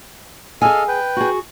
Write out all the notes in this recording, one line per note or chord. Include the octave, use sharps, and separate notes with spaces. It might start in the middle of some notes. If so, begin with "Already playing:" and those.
G#4 A4 D#5 F5 G#5
B4 G5
F#4 G#4